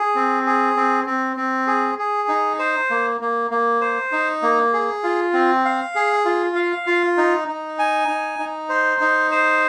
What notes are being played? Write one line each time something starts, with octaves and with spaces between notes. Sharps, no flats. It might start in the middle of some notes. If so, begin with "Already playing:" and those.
Already playing: G#4
C4
G#4
C4
C4
C4
G#4
G#4
D#4
C5
A#3
A#3
A#3
C5
D#4
A#3
G#4
F4
C4
F5
G#4
F4
F5
F4
D#4
D#4
G#5
D#4
D#4
C5
D#4
C5